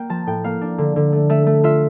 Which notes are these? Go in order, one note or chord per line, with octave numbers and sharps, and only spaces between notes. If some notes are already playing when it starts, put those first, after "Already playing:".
Already playing: A#3 G5
F3 A5
A2 G5
A#3 F5
D4
D3
D3
A3
A3 E5
A3
F4 E5